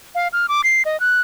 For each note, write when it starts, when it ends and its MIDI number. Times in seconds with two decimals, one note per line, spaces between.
0.15 0.28 77
0.33 0.46 89
0.49 0.61 86
0.64 0.83 96
0.85 0.99 75
1.00 1.21 90